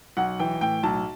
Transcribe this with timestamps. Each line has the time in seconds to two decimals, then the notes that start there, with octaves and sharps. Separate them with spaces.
0.17 B1 F#5
0.40 E3 G5
0.61 A2 G5
0.83 B1 A5